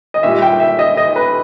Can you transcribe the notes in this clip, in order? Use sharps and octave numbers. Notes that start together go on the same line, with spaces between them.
D#5
A#2 G3 E5
G5
E5
D#5
D#5
B4